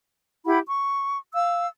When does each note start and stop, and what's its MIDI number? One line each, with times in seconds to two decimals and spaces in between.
0.46 0.59 64
0.46 0.59 67
0.46 0.59 78
0.46 0.59 83
0.67 1.18 85
1.34 1.66 77
1.34 1.66 88